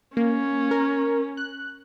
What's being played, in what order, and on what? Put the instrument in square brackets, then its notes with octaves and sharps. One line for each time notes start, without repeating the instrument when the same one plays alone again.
[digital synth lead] A#3 [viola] C#4
[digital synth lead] A#4
F#6